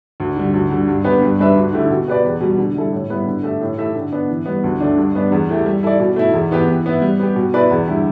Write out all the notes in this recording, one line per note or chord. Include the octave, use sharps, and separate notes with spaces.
D2
D3 G3
D2
D3 G3
G2
D3 B3 G4 B4
G2
G3 D4 B4 E5
D2
D3 A3 E4 G4
B2
B3 G4 B4 D5
E2
B2 G3
D3
G3 E4 A4
A2
G3 B3 E4 B4
D3
A3 G4 E5
A2
A3 E4 G4 E5
D3
B3 D4
E3
G3 B3
D2
D3 A3 D4
G2
G3 B3 D4
E2
E3 A3 G4
G3
E4 A4 D5
B2
A3 E4
E2
E3 B3 G4
E3
B3 E4
G3
B3 G4
B2
B3 E4 B4 D5
E2
D3 G3 E4 G4